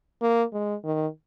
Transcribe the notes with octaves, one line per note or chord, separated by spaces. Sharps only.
A#3
G#3
D#3